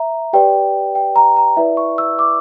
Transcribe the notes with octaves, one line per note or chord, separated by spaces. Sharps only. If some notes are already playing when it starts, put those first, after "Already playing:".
Already playing: E5 A#5
G4 B4 D5 G5
G5
A#5
A#5
E4 B4 D5 E5
C#6
E6
D6